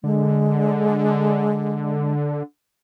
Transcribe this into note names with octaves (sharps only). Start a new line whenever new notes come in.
D3 G#3